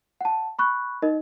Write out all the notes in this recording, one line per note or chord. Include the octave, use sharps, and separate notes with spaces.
F#5 A5
B5 C#6 F#6
D#4 A#4 D#5